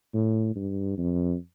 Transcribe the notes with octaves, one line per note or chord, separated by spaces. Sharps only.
A2
G2
F2